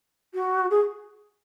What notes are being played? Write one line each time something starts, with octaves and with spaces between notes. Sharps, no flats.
F#4
G#4